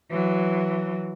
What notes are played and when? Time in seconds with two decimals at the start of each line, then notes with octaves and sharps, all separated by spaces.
0.10 E3 F#3